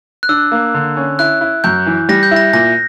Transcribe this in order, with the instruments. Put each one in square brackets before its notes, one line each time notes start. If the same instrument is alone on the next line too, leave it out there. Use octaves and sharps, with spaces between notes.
[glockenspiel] F#6
[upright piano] D4 [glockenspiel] E6
[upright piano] A#3
D3
C#4
[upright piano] E4 [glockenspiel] F#6
[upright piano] E4
[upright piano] F#2 [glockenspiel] G6
[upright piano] E3
[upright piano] G3 [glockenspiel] A#6
[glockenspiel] G6
[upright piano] E4
[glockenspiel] A#6
[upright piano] A#2 [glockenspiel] A#6